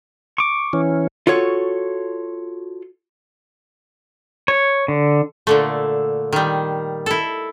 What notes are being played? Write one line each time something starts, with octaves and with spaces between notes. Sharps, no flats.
C#6 D6
E3 C#4
F4 F#4 A4 C#5
C#5
D3
A#2 D3 A3
D#3 G3
E4 A4